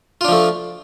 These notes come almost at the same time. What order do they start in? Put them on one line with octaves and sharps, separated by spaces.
F4 D4 F3 A3